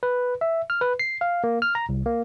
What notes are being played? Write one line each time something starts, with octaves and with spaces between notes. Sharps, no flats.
B4
E5
F6
B4
C7
F5
A#3
F6
A#5
C2
A#3